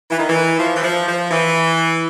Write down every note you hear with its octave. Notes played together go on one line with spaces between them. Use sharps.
E3
D#3
E3
F3
E3
F3
F3
E3